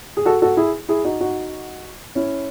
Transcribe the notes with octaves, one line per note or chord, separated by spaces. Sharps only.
G#4
F#4 A4
F#4 A4
E4 G#4
E4 G#4
D#4 F#4
D#4 F#4
C#4 E4